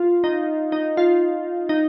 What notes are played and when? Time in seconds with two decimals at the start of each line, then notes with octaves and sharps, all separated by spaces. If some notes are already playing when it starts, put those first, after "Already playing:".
Already playing: F4
0.24 D#4
0.72 D#4
0.97 F4
1.69 D#4